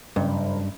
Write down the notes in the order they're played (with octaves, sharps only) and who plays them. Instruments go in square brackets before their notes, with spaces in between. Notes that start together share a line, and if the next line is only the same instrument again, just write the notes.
[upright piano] F#1 [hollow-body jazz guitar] G2